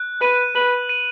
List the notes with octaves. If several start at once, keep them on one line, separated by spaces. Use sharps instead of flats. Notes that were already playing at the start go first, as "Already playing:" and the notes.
Already playing: F#6
B4 D#7
B4 F#7
D#7